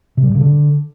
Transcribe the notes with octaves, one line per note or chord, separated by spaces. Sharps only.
C3
G3
A#2
C#3
D3